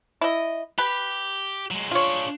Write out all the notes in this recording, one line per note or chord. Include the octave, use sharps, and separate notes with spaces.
E4 D#5
G4 B4
F#3 G#3
D4 F4 G#4 C#5